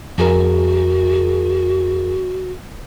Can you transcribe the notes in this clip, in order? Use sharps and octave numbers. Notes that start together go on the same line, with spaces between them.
F2 F#4 G#4 A#4